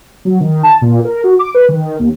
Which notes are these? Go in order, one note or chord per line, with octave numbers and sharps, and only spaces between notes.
F#3
D#3
A5
A#2
A#4
F#4
D6
B4
D#3
D#2